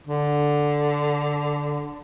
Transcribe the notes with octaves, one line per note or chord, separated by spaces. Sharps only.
D3